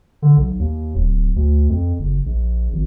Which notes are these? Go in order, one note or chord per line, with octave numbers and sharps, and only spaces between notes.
D3
B1
D#2
D1
D2
F2
F#1
A#1
G#1